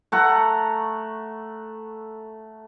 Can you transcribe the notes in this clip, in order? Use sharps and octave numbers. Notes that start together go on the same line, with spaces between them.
A3 F#5 A#5